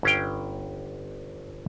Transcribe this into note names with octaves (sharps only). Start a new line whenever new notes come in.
G1 C#4 F5 G5